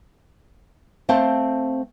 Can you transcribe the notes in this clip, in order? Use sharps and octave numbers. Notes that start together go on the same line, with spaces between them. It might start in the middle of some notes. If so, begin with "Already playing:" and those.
A3 C4 C5 F5 G5 A5